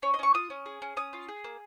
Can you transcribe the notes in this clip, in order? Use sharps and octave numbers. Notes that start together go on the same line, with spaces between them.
C#4 C#5
D#5
C#4 C#6
F4 D#6
C#4
G#4
C#4
C#4 D#6
F4
G#4
A#3